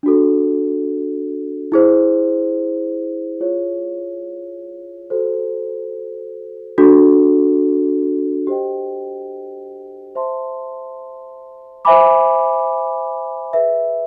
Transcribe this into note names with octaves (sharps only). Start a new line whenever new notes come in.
D4 F#4 A4
E4 G#4 C5
F4 G#4 C#5
F#4 A4 C5
D4 F#4 A4
G4 C5 D#5 G5
C5 E5 A5 C6
C5 E5 G#5 B5 D6
G#4 B4 E5